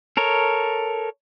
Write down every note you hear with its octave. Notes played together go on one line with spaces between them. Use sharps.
A4 A#4 C#5